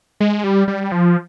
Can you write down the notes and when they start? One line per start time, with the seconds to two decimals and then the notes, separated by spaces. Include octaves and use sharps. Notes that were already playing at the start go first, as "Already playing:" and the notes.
0.20 G#3
0.44 G3
0.68 G3
0.92 F3